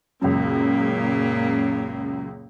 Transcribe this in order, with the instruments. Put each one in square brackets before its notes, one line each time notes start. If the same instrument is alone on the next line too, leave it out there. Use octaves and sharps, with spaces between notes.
[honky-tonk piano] C#2 F#2 [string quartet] A#2 C#3 A#3